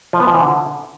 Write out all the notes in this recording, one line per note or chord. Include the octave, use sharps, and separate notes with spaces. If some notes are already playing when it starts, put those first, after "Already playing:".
F3
B3
F3
E3
D3